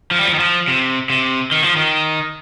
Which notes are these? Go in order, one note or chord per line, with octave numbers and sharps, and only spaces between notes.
F3
G3
F3
D#3
F3
C3
C3
D#3
F3
D#3